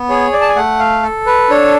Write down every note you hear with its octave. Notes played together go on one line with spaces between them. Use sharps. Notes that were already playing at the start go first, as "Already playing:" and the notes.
Already playing: B3
G#4 C#5
D5
A5
G#5
A3 F#5
F5
A4
B4
D4 C#5